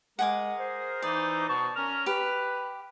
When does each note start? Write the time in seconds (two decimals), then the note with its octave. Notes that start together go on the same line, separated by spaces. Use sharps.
0.19 G#3 G#4 A#4 F#5 G#5 D6
0.59 C5
1.02 E3 D#4 D5
1.48 B2 A5 C#6
1.76 C#4 A#4 F6
2.06 G4 B4